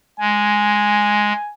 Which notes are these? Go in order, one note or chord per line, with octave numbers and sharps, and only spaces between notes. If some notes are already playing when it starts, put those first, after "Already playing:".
G#3 G#5